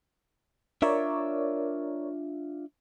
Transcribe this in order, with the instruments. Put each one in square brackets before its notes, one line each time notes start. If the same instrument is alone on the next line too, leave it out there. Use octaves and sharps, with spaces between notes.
[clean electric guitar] D4 F4 E5 [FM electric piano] A#4 C#5 D5